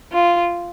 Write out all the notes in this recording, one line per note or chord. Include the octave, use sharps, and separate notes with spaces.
F4